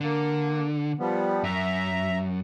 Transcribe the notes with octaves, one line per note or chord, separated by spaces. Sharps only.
D3 A#3
F3 G3 B3
F#2 E5 A#5